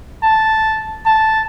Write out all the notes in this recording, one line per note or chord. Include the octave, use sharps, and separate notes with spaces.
A5
A5